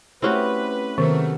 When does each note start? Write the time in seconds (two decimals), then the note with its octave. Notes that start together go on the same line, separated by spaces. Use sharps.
0.22 A3 C4 C#4 E4 F#4 G4 B4
0.98 C3 D#3 F#3 A3 B3 A#4